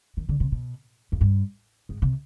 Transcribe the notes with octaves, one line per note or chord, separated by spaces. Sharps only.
D#3
D3
C3
B2
F2
G2
G#2
C3